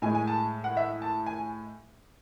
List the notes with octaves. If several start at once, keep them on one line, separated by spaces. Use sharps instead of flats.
A2 G#3 G#5
G#5
A5
F#5
E5
A5
G#5